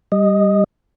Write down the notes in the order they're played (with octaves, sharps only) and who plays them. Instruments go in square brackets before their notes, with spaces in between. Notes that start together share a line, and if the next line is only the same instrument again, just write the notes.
[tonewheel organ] G3 D#5